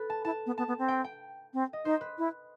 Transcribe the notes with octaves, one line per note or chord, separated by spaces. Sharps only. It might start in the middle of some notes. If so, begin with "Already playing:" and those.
Already playing: A4 B4
A5
E4 A5
B3
B3 A5
B3
C4
G5
G5
C4
D#5
D#4 C5
B4
E4